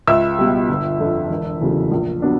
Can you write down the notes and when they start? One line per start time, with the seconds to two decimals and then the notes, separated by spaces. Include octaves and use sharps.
0.07 C#2 E5 E6
0.38 B2 G3
0.69 G1
1.00 F2 D3
1.30 E1
1.61 E2 C#3 F#3 A3
1.91 A#1
2.22 F#3 B3 D4